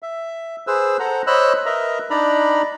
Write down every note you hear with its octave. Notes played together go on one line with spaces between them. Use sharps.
E5
G#4 B4 C5 E6
A4 C5 F#5 A#5
C5 C#5 D#5 B5 E6 F#6
A#4 B4 D#5 E5 A#5
D4 D#4 D5 A#5 B5